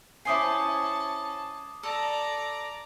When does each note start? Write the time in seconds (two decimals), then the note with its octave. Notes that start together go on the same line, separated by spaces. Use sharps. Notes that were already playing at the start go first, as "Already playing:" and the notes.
0.25 C#4 E4 C5 G#5 A5 D6 D#6 C7
1.83 A4 D5 A#5